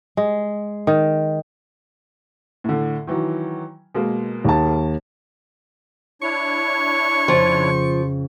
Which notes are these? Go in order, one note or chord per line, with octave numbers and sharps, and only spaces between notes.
G#3
D#3
A2 D3
D#3 E3 F#3
B2 G#3 A#3
D#2 A5
D4 E4 C#5 C#6
F2 C#3 F3